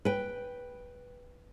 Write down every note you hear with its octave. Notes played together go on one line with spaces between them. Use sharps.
B4 G5